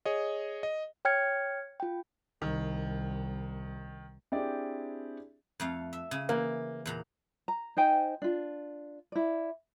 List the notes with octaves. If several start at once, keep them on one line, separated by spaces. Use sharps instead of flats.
G#4 C#5 D#5
D#5
C#5 G5 F6 G#6 C#7
F4 G5
C2 D#3
C4 D4 E4 G4 G#4 D5
F2 A3 F5
E5
C#3
E3 A#3
E2 A#2 A#5
A#5
D#4 C5 G5 G#5
D4 F4
E4 D5